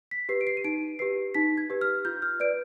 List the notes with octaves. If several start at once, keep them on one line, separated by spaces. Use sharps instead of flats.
B6
G4 B4 C7
D7
C7
D#7
D#4 D7
G4 B4 C7
D#4 B6
G#6
G4 B4
F6
F4 G6
F6
B4 D5 D7